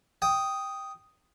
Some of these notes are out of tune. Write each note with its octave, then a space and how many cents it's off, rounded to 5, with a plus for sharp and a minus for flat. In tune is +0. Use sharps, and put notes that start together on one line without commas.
G5 +0 D#6 +0